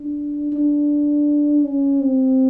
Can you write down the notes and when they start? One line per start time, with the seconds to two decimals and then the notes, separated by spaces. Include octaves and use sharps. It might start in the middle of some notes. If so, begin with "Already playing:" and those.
Already playing: D4
0.52 D4
1.64 C#4
2.00 C4